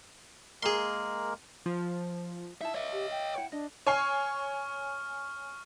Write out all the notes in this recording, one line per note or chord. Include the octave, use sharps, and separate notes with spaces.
G#3 A#3 G#4 A#4 C6
F3
D#4 E4 E5 A5
C#5 D#5 E5
G4
G5
E4 F#5
D4 D#5
C#5 G#5 C#6 F6 C7